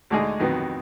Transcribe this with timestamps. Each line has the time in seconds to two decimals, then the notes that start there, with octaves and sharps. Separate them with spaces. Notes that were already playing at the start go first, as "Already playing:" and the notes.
0.10 D2 D3 G#3 D#4 G#4
0.40 F2 D#3 F#3 B3